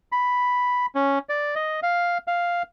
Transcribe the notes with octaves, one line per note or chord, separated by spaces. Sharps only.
B5
C#4
D5
D#5
F5
F5